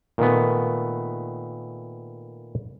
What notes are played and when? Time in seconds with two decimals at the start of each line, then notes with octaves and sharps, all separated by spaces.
0.18 A#2 D#3 A3 B3